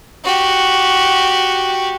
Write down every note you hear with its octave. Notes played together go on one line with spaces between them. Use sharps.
F#4 G4